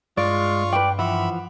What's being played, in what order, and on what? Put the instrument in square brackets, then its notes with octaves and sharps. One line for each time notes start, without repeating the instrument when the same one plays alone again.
[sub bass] G2 [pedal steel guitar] G#3 [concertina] F4 F5 C#6 [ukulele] D5
[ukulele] B4 G5 [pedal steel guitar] D5
[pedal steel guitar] E3 F3 [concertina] E5 B5 [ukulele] F#5